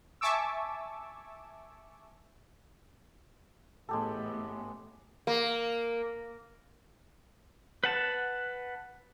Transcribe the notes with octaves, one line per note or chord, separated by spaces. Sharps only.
E5 G#5 A5 C#6 D6 E6
A1 A2 G#3 B3 G4 A4
A#3
B4 F#5 A5